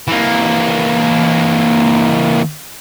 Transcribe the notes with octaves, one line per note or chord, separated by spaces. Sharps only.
E3 A#3